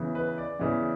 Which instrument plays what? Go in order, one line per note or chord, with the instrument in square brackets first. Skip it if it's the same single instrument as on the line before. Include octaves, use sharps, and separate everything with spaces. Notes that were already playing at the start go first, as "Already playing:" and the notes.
Already playing: [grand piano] E2 C#3 E3
B4
D5
E2 C#3 E3